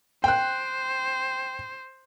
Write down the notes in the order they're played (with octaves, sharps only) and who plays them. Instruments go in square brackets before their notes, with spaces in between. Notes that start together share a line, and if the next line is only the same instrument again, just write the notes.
[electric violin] C5 [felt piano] G5 F#6